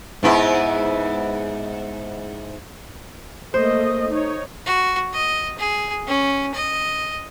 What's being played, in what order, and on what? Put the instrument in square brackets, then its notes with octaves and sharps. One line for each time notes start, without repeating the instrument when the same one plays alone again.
[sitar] G#2 B3 E4
[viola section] A3 A#3 D#5 [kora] C5
[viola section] D#4 C#5
[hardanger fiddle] F#4
D#5
G#4
C#4
D#5